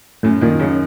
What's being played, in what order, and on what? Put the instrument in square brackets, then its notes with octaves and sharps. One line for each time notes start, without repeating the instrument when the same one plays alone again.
[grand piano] F#2 [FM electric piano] A2
[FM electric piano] A#2 [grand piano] D#3
[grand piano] F#2 [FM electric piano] C#3